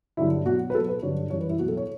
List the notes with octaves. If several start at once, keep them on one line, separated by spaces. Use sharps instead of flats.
G2 D3 F#3 E4
B2 F#3 F#4
B4
B2 F#3 A4
B4
G2 D3 F#3 C#5
F#2 E3 G3 C#5
B4
E4
B2 F#3 F#4
A4
C#5